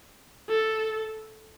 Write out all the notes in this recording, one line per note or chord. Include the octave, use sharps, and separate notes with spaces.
A4